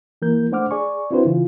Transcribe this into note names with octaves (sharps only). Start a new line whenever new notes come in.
E3 A#3 A#4 G6
A3 D4 C5 F#5 D6 F6
G#4 D5 G#5 C#6
C4 D4 E4 F#4 B4 C5
C#3 E3 F4